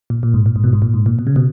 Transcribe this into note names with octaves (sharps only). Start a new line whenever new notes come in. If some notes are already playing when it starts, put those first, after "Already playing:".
A#2
A#2
G#2
A#2
G#2
B2
G#2
A#2
G#2
A#2
B2
C#3
B2